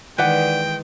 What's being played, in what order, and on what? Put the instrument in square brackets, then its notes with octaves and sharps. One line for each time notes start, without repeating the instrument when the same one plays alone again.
[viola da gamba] D#3 G#3 D#4 [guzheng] E3 [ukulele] B4 D5 F#5 [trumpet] G5